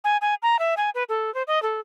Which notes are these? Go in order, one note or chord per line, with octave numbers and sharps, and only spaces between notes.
G#5
G#5
A#5
E5
G#5
B4
A4
C5
D#5
A4